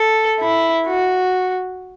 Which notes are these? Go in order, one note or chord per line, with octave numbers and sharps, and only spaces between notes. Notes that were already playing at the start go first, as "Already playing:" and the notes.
Already playing: A4
E4
F#4